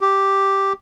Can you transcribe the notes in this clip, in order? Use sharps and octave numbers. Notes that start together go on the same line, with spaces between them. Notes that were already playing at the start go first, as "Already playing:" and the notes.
G4